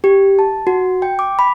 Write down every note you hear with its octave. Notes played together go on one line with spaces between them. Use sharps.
G4
A5
F#4
G5
D6
B5